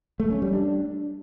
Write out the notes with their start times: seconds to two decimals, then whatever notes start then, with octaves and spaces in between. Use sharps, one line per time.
0.20 A3
0.31 C#4
0.42 G3
0.53 D4